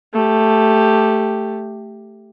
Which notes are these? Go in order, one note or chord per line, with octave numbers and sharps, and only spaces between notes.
A3 G4